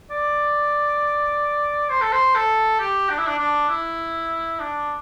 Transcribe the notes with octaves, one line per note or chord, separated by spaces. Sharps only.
D5
C5
A4
C5
A4
G4
D4
E4
D4
D4
E4
D4